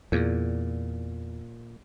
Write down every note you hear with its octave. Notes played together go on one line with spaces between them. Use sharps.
E2 A#2